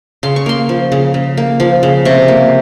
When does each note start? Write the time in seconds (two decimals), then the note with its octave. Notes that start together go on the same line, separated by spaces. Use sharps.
0.23 C#3 C6
0.36 C#6
0.46 A#3 C6
0.69 F3
0.92 C#3
1.14 C#3
1.37 A#3
1.60 F3
1.83 C#3
2.05 C3 C#6
2.28 A#3